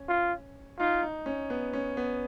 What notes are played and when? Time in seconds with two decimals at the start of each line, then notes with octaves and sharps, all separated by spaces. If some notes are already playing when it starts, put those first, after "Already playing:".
Already playing: C#4
0.09 F4
0.79 D#4 F4
1.03 D#4
1.26 C#4
1.50 B3
1.73 C#4
1.97 B3